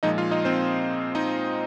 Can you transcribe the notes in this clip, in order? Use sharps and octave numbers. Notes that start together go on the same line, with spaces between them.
A#2 F3 G#3 D#4 D#5
F4 F5
D#4 D#5
C4 C5
D#4 D#5